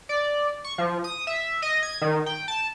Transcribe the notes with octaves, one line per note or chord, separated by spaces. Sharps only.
D5
C#6
F3
D#6
E5
D#5
G#6
D#3
G5
A5